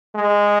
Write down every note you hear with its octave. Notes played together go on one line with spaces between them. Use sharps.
G#3